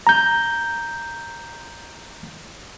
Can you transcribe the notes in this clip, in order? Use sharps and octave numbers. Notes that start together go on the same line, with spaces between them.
A#5 G6